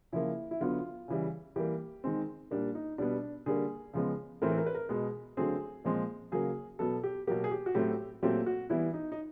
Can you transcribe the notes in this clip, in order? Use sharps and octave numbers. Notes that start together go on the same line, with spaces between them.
C#3 F3 A#3 E4
E4
D3 F#3 B3 F4
C#3 E3 G3
E3 G3 A#3 G4
D#3 G#3 C4
A#2 G3 A#3 D4
D#4
B2 G3 B3 D4
D3 G3 A#3 G#4
C#3 F3 G#3 B3
A2 E3 A3 C4 A#4
B4
A#4
B4
A#4
B2 G#3 B3 G#4
D3 F#3 A3 C4 G#4
A#2 F3 G#3 C4
C#3 F#3 A#3 G#4
B2 F#3 B3 A4
G4
B2 F#3 A#3 G4
G#4
G4
F#4
A2 F#3 A3 C4 G4
A#2 F#3 A3 C4 G4
F#4
E3 G3 B3 E4
D#4
D#4